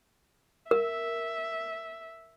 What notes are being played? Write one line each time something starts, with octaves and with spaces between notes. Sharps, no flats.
A#4 E5